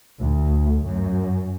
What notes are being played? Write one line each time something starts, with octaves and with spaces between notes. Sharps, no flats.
D2
F#2